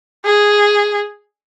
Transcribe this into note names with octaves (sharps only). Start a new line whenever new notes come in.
G#4